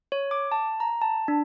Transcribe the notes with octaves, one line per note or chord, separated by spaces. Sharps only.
C#5
D6
A5
A#5
A5
D4